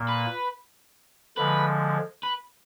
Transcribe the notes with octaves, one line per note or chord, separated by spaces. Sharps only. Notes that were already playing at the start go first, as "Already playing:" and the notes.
Already playing: A#2 A#3
B4
D3 F3 G#3 B4
B4